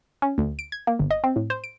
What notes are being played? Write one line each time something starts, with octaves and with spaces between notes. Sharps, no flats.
C#4
D2
D7
G#6
A#3
G1
D#5
C4
A2
C5
D7